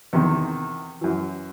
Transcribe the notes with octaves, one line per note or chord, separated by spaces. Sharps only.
E2 C3 D#3
F#2 E3